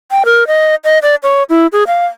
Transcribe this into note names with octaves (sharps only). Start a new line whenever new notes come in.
G5
A#4
D#5
D#5
D5
C#5
E4
G#4
F5